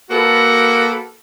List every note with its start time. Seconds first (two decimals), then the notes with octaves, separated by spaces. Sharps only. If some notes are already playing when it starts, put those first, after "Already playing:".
0.10 A#3 F#4 A4 B4